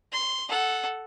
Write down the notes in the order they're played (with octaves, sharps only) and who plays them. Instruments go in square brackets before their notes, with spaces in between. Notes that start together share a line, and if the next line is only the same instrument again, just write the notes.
[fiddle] C6
A4 F#5